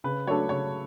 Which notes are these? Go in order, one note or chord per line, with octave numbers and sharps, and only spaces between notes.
C#3 B4
F#3 A3 D4 A4 C#5
C#3 C#5